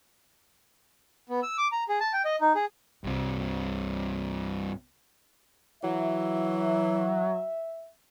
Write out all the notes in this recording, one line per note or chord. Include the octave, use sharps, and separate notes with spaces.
B3
E6
D6
A#5
G#4
A5
G5
D#5
D#4
G#4
C2 G2 C4
E3 F#3 E5